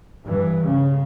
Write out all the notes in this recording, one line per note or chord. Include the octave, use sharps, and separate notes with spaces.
G2 E3
C#3